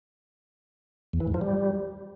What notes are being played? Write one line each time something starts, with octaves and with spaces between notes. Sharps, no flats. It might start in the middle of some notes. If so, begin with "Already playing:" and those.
E2
E3
G#2
F3
G3